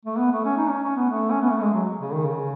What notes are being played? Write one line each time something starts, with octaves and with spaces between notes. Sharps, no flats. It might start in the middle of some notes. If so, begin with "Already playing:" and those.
A3
B3
A3
C#4
D#4
C#4
C#4
B3
A3
C#4
B3
A3
G#3
F#3
C#3
D#3
C#3